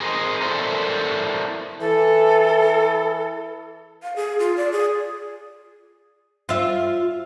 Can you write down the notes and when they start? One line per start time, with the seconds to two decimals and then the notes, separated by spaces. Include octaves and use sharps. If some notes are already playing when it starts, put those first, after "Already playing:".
0.01 G#4 A#4 C5 D#5
0.42 E4 A4 A#4 C5 D5 E5
1.81 E3 A4
4.03 F5
4.16 G#4
4.39 F4
4.57 D5
4.72 G#4
6.49 F4 E5